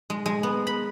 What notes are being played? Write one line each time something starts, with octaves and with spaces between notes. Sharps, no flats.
G#3
G#3
B3
B5